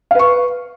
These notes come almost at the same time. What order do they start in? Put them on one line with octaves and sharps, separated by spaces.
F5 B4 C#6